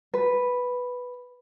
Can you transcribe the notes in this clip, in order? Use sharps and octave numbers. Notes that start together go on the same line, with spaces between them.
B4